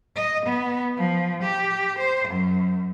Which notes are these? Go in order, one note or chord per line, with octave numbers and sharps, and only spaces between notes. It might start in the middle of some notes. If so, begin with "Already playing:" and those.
D#5
B3
F3
G4
C5
F#2